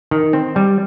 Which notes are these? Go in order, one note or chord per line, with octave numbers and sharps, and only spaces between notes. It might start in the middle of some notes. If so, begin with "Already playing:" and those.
D#3
C4
G3